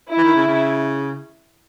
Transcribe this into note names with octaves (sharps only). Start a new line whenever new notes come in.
E4
E3
D#3
C#3
C#3